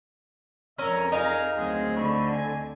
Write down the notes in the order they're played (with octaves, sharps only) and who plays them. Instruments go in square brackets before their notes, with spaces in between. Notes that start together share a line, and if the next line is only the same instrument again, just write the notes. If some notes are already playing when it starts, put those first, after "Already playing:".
[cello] F2 A#4 [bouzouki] C#4 [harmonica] E5 E6
[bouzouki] D#4 F5 [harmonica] G#4 A#5
[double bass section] D2 C4 [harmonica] D#3 G#3 G#4 [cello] F#3
[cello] D3 [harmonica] B5 C#6
[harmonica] G#5